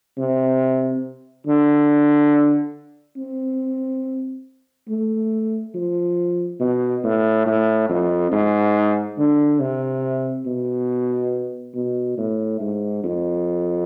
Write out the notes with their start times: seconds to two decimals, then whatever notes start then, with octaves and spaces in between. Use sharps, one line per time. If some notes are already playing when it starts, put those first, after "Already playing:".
0.17 C3
1.46 D3
3.17 C4
4.89 A3
5.74 F3
6.60 B2
7.04 A2
7.46 A2
7.89 F2
8.32 G#2
9.18 D3
9.60 C3
10.46 B2
11.74 B2
12.17 A2
12.60 G#2
13.04 F2